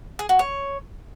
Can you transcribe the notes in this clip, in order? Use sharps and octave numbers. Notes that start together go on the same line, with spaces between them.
G#4
F#4
C#5